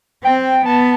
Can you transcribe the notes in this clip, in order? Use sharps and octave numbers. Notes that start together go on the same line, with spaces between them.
C4 G5
B3 A5